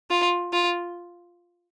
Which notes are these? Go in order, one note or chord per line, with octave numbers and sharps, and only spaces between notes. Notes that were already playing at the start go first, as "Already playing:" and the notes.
F4
F4